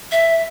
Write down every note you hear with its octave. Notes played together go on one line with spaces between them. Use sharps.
E5